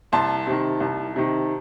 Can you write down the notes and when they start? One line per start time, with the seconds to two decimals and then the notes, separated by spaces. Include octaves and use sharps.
0.12 C2 A5 C6
0.47 C3 D#3
0.80 C2
1.16 C3 D#3